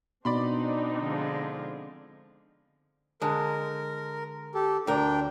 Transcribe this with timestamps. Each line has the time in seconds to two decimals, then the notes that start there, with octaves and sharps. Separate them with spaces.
0.25 B2 C4 D4 D#4 D5 B5 C6
0.98 D3 F3 G#3
3.22 D3 G#3 A#4
4.55 G4 A4
4.87 D2 D4 A#4 G5